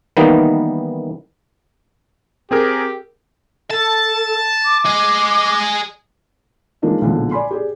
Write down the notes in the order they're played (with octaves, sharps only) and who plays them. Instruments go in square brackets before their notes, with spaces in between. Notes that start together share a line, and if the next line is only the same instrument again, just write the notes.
[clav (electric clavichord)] D#3 E3 G3 A#3 B3 D#4
[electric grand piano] C4 G#4 A#4 [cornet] G4
[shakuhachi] A4 [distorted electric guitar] A5
[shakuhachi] D6
[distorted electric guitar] G#4 D#5
[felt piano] F3 G#3 A#3 D4 D#4
B1 A#2 D3 F3 G#3
D5 G#5 B5 C6
G4 G#4 D5